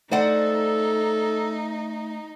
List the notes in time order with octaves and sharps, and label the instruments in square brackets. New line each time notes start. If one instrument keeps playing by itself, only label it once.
[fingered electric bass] A3 [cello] D#4 [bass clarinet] A4 [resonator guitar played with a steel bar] C5 D5 F#5